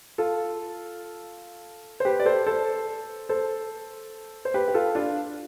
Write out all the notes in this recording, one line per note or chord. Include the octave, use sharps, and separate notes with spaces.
F4 A4
C5
G4 B4
D5
A4 C5
A4 C5
A4 C5
C5
G4 B4
G4
F4 A4
D4 F4